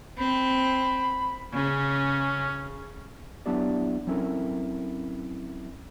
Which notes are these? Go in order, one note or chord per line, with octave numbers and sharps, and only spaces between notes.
C4 B5
C#3 C#4
F#3 B3 D4 E4 G4 D5
F#3 C4 C#4 E4 A4 A#4